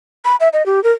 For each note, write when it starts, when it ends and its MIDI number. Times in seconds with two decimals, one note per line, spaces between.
0.25 0.36 83
0.40 0.49 76
0.53 0.65 75
0.66 0.82 67
0.84 0.92 70